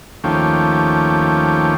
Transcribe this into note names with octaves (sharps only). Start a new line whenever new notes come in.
D#2 F3 A3 C#4 G4